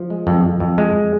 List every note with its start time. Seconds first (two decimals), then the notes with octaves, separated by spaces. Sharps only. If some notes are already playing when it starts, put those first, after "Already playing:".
Already playing: F3
0.10 G#3
0.27 F2
0.44 F2
0.60 F2
0.78 G#3